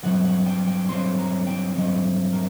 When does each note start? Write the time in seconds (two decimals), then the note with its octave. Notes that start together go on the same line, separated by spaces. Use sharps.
0.03 G2 F#3 C4 F#5
0.24 F#5
0.46 G5
0.67 G5
0.89 G2 F#3 C4 C6
1.19 A#5
1.47 G5
1.75 G2 F#3 C4 D#5
2.33 A#4